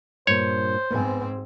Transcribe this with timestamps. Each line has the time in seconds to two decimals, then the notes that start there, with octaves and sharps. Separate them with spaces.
0.27 G2 A#2 C5 C#5
0.90 G#2 B3 C4 G#5